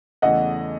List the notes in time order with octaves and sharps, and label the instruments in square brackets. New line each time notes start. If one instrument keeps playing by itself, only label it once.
[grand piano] E2 C#3 E3 A3 [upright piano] D#5 F#5